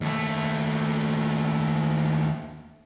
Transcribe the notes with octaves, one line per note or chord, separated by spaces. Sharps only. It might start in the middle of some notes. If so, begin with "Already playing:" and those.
D#2 A3